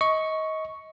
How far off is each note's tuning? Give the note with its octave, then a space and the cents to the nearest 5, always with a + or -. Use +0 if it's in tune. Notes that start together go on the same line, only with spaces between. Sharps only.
D#5 +25 C#6 +0